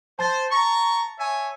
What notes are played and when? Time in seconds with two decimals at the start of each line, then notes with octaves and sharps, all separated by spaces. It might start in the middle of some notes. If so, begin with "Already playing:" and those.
0.19 C5 A5 A6
0.51 A#5 C#6
1.19 C#5 E5 G#5